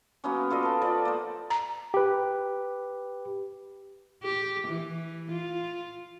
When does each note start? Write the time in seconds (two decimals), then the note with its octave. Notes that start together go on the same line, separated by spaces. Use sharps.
0.24 F#3 A#3 B3 C#4
0.50 F4 A4 D5 D#5
0.63 B4 A5
0.82 F3 D5 D#5
1.05 A#3 C5
1.50 A#5
1.94 G4 B4
4.23 G4
4.67 E3
5.31 F4